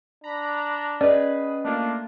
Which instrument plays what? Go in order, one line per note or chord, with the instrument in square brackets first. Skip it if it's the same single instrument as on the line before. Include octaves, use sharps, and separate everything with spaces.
[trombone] D4 [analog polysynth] A#5 B5
[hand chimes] C#4 D#5 [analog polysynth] G#4 B4 [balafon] D5
[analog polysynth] A3 A#3 F4 [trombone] D4